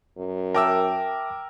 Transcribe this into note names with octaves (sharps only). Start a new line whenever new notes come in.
F#2
A#4 E5 G5 A5 D6 E6